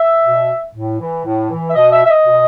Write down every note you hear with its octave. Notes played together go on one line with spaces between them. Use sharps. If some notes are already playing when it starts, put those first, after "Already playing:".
Already playing: E5
B2
A2
E3
A2
E3
E5
B2 D#5
E5
E5
D#5
B2